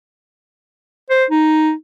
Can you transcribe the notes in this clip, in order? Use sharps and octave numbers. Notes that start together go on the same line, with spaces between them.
C5
D#4